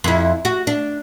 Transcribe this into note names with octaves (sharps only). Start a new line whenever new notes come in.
F2 E4
F#4
D4